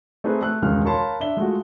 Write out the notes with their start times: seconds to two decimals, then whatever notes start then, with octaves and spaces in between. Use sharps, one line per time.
0.24 A3 C4 D#4 G#4 B4
0.42 A3 E6 F#6
0.62 E1 C#2 D#3 G#3 F6
0.85 A#4 C#5 F5 A5 B5 C6
1.20 D4 E5 G7
1.37 G#3 A3 F4 F#4